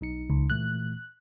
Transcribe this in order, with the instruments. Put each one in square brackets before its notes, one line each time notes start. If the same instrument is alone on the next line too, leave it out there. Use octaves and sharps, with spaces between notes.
[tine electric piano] B1 D#4 C#7
[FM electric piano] C#2
[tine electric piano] A#2 E3 A3 [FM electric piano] F#6